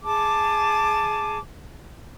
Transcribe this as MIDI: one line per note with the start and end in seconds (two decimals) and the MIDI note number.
0.02 1.38 68
0.02 1.38 81
0.02 1.38 86